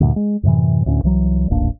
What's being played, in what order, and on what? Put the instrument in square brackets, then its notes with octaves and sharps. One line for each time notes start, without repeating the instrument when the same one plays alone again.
[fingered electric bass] D2 G2 A#2
G#3
F#2 A2 C3 E3
D2 A2 C#4
C2 E3 F#3
D#1 A1 A#3 D4